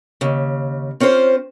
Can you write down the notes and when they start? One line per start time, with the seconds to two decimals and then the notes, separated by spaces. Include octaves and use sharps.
0.21 D#2 C#3
1.00 C4 C#4 F4 A#4 C5